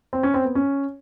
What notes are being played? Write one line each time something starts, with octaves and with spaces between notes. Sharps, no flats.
C4
C#4
C4
B3
C#4